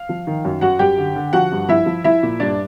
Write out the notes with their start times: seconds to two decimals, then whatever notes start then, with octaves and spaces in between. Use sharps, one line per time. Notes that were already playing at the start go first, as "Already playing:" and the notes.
Already playing: F5
0.09 F3
0.27 D#3
0.45 F#2
0.61 F#2 F#4 F#5
0.79 F#2 G4 G5
0.98 D3
1.16 D3
1.33 F3 F#4 F#5
1.52 G2
1.68 F3 E4 E5
1.86 F3
2.04 F3 E4 E5
2.23 A#2
2.40 G2 D4 D5